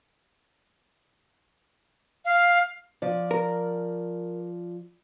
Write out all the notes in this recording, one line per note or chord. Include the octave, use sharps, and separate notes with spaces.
F5
F3 D5
A#4